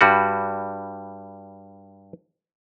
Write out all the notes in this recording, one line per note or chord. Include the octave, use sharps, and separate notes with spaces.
G2 G3 F#4